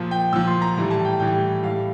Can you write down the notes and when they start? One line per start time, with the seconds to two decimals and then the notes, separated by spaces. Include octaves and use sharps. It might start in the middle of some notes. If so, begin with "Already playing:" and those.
Already playing: A#2 F3
0.11 G5
0.33 A#2 E6
0.36 F3
0.47 C6
0.62 A#5
0.76 A2 E3 G3
0.91 A5
1.05 G5
1.20 A2 E3 G3 G5
1.63 A2 G3 F5